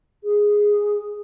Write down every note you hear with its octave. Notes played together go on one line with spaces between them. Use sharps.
G#4